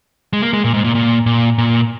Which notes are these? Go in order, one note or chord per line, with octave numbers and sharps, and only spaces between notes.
G#3
A#3
G#3
A#2
G#2
A#2
A#2
A#2
A#2